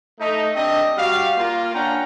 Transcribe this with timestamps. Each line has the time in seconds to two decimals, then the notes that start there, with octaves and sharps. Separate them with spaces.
0.20 A3 D#4
0.55 C4 D4 G4 D#5
0.97 G3 F#4 D5 F5
1.37 A#3 F4
1.74 C#4 D4 F#5 G5 A#5